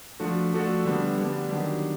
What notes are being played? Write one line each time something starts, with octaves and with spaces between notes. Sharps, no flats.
F3 A3 D4 F#4 A4
F3 A3 D4 F#4 A4
D3 G3 B3 D4
D3 G3 B3 D4
D#3 F#3 B3 D4 G4